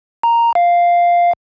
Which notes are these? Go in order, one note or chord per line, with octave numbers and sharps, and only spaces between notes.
A#5
F5